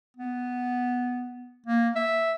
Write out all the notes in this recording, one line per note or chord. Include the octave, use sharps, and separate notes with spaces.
B3
A#3
E5